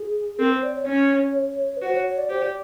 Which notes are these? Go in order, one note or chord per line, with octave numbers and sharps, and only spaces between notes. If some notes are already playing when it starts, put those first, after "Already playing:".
Already playing: G#4
C4 A#4
C5
D5
C#5
C#4 C#5
B4
F#4 C5
C#5
C#5
D5
G4 C5
D5